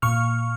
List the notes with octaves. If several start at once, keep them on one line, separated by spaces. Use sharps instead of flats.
A#2 C#6 F6